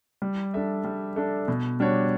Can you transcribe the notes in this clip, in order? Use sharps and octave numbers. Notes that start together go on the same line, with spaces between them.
G3
D4 A4 E5
G3
D4 A4 E5
B2
G3 D4 F#4 C#5